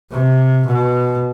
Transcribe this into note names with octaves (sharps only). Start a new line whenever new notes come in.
C3
B2